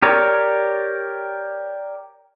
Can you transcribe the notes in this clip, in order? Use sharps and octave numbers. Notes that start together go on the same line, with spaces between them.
G4 A#4 C#5 D5